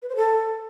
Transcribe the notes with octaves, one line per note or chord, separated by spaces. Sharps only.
B4
C5
A4